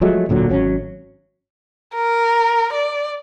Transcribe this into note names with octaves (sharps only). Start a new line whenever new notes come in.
F3 F#3 G#3 A3
D1 A#2 D3 F#3
G#1 F#3 C4 C#4
A#4
D5